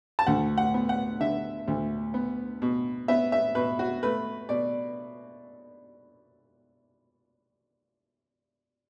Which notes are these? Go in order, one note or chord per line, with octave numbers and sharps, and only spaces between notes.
A5
D2 F#5
F#5
B3
F#5
D3 E5
D2
B3
B2
B3 E5
E5
B2 B4
F#4
A3 B4
B2 D5